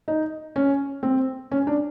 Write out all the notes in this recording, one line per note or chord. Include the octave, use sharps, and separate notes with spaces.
D#4
C#4
C4
C#4
D4